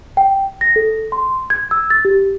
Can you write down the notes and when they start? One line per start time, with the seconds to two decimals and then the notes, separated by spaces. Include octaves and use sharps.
0.17 G5
0.61 A#6
0.76 A4
1.12 C6
1.50 G#6
1.71 E6
1.90 A6
2.05 G4